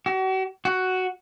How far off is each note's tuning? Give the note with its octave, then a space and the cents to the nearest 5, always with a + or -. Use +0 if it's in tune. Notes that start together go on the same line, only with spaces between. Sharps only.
F#4 +40
F#4 +5